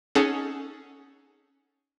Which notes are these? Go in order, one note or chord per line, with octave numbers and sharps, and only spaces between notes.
C#4 D#4 G#4 A4 F#5